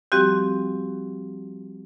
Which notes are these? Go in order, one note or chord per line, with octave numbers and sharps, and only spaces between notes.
F3 G3 C4 F#4 G4